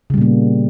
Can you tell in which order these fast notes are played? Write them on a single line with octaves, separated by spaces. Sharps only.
C#3 G3 A#2 A#3 B3